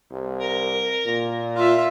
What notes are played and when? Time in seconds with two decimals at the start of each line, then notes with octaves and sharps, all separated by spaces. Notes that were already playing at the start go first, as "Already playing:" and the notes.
0.12 C2
0.40 A#4
1.06 A#2
1.55 F4 E5